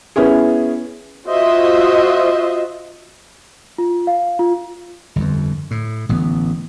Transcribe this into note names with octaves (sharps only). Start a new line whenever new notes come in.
B3 C#4 E4 G#4
F4 F#4 C5 D#5 E5
F4
F5
F4
G1 F2
A2
A1 G2 D3 B3